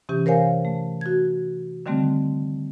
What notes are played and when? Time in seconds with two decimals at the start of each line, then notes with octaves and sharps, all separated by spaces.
0.09 C3 E3 C#4 G4
0.26 A#4 C5 C#5 F5 G#5
0.65 A3
1.01 F#4 G#6
1.86 D3 D#3 G3 A3 C4